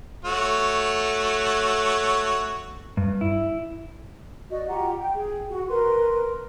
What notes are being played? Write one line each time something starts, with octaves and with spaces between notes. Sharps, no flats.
A3 F#4 C#5
G2
E4
F#4 D5 D#5
F4 G4 F#5 A#5
G5
G#4
F#4
A#4 B4 C6